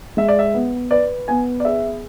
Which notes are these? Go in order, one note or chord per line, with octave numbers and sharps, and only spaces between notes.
G#3 E5
D5
E5
B3
B4 D5
B3 G#5
D5
G#4 E5